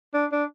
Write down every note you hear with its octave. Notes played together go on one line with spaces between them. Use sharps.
D4
D4